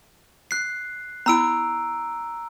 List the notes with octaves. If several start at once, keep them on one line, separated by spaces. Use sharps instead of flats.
F#6 C7
B3 E4 A#5 E6 D7